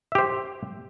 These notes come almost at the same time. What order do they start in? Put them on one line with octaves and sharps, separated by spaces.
E5 G4 C5